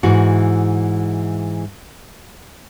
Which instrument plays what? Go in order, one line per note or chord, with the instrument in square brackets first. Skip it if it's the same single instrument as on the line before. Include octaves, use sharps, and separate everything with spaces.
[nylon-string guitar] G#2 E3 E4 F#4